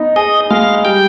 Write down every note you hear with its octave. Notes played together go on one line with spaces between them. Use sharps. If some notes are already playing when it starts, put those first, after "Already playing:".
Already playing: B3 D#4
G#4 D#5
G#3 F5
G3 G5